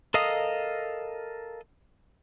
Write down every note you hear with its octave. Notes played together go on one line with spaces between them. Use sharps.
A4 A#4 D#5 F5 D#6